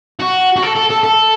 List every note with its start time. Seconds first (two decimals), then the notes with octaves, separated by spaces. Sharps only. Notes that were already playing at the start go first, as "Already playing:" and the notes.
0.20 F#4
0.56 F#4
0.63 A4
0.75 A4
0.90 A4
1.03 A4